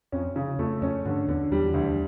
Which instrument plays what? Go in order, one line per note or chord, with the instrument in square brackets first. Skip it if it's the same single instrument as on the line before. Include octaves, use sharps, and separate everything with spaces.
[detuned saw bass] F2 [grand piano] C#4
[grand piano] C#3
[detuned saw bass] F2 [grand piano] A3
[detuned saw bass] F2 [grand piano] C#4
[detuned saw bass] G2 [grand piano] D3
[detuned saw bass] E2 [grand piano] D3
[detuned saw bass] E2 [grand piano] G3
[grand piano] D2